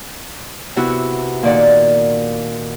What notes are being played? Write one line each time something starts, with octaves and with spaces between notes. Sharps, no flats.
C3 B3 E4 F#4
A#2 D#3 D5 F#5